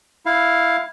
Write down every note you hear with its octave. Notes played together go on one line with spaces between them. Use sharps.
E4 F5